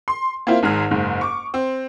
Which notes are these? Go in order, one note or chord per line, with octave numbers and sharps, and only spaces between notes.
C6
A#3 C4 E4 F4
G#1 G#2 G#4 F6
F#1 G#2
C#6 D6
C4